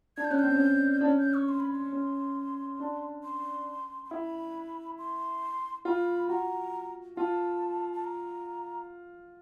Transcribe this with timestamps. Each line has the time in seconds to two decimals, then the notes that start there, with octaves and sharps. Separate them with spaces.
0.17 D4 G#6
0.24 G6
0.30 C#4 F#6
0.39 C4 G6
0.56 C#4
1.01 D4
1.05 C#4
1.19 G6
1.34 C#6
1.49 C6
1.60 B5
1.71 C6
1.93 C#4
2.80 D4
3.24 C6
4.05 C6
4.10 E4 B5
4.98 C6
5.85 F4 B5
6.29 F#4 A#5
7.17 F4 A5
7.93 A5
8.04 A#5